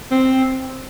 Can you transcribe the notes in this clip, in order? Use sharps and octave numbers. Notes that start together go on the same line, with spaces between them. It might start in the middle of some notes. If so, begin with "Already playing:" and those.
C4